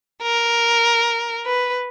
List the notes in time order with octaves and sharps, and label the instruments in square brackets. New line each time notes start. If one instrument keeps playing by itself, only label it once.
[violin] A#4
B4